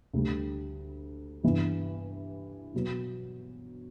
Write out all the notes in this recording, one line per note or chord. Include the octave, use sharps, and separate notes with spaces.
D2 D3 G3
G2 E3 B3
B2 F#3 B3